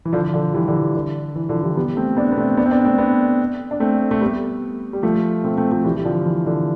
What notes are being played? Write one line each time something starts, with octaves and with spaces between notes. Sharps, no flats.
E3
D3 F3
D3 F3
E3 G3
D3
E3
D3
E3
D3 F3
E3 G3
G3 B3
A3 C4
B3 D4
B3
A3 C4
B3 D4
C4
B3 D4
A3 C4
B3 D4
D4
A3 C4
A3
G3 B3
G3
F3 A3
A3 C4
A3 C4
F3 A3
E3 G3
G3
D3 F3
E3
D3